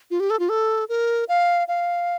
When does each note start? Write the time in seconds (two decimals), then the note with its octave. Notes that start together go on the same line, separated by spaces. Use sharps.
0.11 F4
0.20 G4
0.30 A4
0.39 F4
0.49 A4
0.89 A#4
1.29 F5
1.68 F5